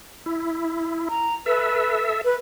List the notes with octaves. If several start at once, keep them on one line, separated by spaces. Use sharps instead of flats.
E4
A#5
A4 B4 E5
B4